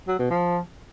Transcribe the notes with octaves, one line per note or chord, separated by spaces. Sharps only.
F#3
B2
F3